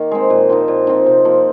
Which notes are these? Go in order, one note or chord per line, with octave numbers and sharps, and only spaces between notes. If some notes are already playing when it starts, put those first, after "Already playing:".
Already playing: D#3 A#3 D#4
G#3 C4
A#2
F3 C4 D#4
A#2
F3 C4 D#4
C3
F3 A#3